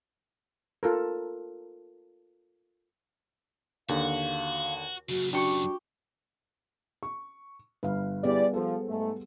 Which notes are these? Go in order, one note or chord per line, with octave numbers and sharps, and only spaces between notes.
F4 A4 A#4
D#2 D3 F#4 F5
F#2 C#3 F#4
D4 F#4 G4 C#6
C#6
G1 B4 F5
G3 B3 E4 G4 G#4 D5
F3 A4 C5
G#2 A3